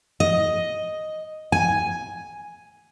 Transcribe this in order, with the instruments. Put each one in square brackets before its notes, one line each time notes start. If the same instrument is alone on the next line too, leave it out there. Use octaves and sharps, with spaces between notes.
[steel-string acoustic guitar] D#5
G#5